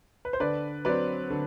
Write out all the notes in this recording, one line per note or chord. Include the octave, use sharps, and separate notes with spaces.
B4
C5
D3 B4 D5
F#3 C4 B4 D5
D3